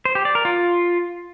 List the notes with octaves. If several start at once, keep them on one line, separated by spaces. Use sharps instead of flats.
C5
G4
D5
A#4
F4